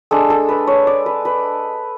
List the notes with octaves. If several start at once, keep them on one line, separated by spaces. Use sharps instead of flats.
G#3 D4 A4
A4
B4
C#5
D5
B4
B4